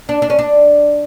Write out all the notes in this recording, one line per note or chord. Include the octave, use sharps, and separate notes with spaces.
D4
D4
C#4
D4